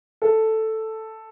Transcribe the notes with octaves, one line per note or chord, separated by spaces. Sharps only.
A4